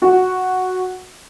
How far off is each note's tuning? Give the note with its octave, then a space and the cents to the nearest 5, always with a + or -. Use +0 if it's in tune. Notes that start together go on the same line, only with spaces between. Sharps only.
F#4 -5